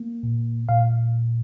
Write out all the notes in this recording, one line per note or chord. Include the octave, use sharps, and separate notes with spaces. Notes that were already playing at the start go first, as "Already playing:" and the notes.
Already playing: A#3
A#2
A#2 F5